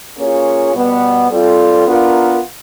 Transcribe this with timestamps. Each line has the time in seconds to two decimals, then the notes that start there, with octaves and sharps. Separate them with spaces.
0.18 A#3 C#4 F4 G#4 C#5
0.74 B2 G3 B3
1.30 G3 C4 F4 A4
1.86 B3 D4 F4 A#4